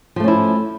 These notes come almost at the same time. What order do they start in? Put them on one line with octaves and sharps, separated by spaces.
F3 A3 C#4 E4